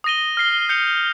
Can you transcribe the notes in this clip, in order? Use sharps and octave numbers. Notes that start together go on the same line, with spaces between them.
D#6 A#6 D#7 G7
F6 C7 G7
G6 C#7 F7